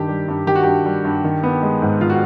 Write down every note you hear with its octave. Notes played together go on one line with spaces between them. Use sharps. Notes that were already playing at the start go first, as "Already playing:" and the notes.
Already playing: G2 D#3 G4
G3
G2
D#3 G4
F#4
G2 G4
G3
G2
D#3
B3
G#3
G#2
D#3 F4
F#4